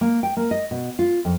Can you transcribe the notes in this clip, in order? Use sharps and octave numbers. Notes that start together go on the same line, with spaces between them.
A#3
G5
A#3
D#5
B2
F4
F2